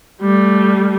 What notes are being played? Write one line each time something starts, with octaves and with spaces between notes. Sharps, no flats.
G3 A3